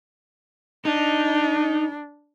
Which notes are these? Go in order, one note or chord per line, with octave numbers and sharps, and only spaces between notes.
D4 D#4